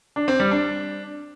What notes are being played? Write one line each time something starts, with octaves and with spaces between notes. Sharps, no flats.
D4
C4
G3
D4